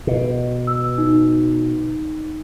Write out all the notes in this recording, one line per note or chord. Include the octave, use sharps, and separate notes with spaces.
B2
E6
D#4